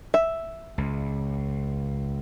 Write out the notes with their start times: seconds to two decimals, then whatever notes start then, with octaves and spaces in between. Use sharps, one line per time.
0.14 E5
0.78 C#2